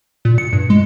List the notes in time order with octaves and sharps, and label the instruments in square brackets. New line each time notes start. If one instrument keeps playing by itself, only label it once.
[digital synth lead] A#2
C#7
G2
G#3